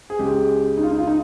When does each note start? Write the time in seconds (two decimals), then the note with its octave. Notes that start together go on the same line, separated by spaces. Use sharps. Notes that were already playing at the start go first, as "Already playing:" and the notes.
0.10 G#4
0.19 C#2 C#3 G#3 G4
0.77 D#4
0.83 F4
0.91 D#4
0.99 F4
1.07 D#4